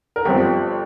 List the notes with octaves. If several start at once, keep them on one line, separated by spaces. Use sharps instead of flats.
A#4
G1 G2 F3 C4 G4